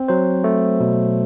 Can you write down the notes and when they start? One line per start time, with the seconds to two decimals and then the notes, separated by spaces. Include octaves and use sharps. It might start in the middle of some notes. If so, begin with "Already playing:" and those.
Already playing: C4
0.08 F#3 C5
0.44 A3
0.80 B2